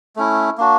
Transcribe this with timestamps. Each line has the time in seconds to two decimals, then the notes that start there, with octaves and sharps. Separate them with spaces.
0.16 A3 C#4 E4
0.58 A#3 D4 F#4